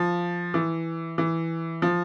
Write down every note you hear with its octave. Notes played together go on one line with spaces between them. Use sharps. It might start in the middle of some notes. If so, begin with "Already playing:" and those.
Already playing: F3
E3
E3
F3